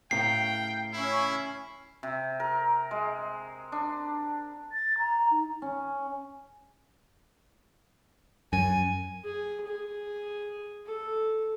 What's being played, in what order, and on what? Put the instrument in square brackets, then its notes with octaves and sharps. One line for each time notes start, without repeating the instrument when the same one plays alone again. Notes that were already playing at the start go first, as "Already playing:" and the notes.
[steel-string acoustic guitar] A2 C#3 A#4 [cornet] G5 [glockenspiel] C7
[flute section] C#4 [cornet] E4
[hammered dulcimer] C3
A#4
G#3
D4
[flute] A6
A#5
D#4
[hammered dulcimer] C#4
[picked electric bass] F#2 [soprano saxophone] G#5
[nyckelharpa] G#4
G#4
A4